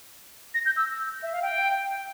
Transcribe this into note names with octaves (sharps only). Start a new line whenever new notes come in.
A#6
G6
E6
E5
F5
G5